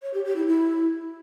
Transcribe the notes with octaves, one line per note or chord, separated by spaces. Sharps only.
C#5
G4
G4
E4
E4